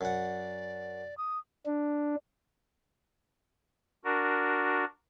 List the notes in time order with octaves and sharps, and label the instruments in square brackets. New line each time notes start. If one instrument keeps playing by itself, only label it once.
[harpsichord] F#2 F#5 [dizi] D5
[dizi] D#6
[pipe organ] D4
D4 F#4 A#4